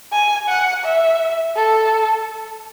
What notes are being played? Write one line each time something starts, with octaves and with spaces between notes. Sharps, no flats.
G#5
F#5
E5
A4